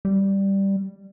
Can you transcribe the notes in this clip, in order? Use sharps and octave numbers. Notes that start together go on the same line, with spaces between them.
G3